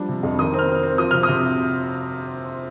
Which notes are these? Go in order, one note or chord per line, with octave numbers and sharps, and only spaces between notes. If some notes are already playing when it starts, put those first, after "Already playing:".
Already playing: F3 G3 D4
C3
F2
D#3 D#6
C4
F6
C4
C4
F3 D#6
C3 F6
D#6
C3